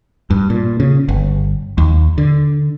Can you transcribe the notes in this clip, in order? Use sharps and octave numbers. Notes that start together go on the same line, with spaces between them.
G2
A#2
C#3
G1
D#2
D3